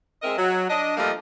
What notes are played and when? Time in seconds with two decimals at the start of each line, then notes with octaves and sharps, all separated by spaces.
0.23 G#3 C4 A#4 D#5 E5
0.38 F#3
0.69 D4 D#5
0.97 F3 G3 A3 A#3 F4 D#5